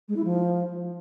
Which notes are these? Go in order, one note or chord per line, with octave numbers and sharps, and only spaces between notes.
G#3
E4
F3